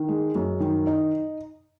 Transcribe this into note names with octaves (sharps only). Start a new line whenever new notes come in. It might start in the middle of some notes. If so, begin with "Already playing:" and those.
Already playing: D#3
G#3
F#2
D#3
D#4